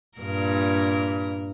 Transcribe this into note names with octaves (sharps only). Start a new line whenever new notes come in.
G2 A#2 A#4